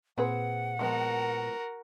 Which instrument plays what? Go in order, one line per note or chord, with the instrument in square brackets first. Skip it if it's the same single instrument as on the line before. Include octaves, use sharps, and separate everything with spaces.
[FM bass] A#2 [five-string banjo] C4 G#4 B4 [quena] F#5
[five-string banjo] F3 G#3 B3 [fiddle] F#4 A#4